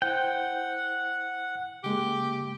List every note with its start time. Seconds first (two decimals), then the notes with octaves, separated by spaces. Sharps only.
0.02 E4 C5 F#5 G5
1.84 C#3 G#3 A#3 G4